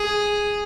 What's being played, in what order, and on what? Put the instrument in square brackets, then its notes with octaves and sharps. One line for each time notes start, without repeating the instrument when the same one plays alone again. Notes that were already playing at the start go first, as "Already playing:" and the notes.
Already playing: [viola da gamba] G#4